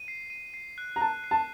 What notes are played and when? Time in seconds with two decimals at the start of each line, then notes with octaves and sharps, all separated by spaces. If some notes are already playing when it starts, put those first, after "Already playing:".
Already playing: D#7
0.08 C7
0.30 D#7
0.54 C7
0.78 F#6
0.96 A#5
1.01 A5 F#6
1.24 C7
1.31 A5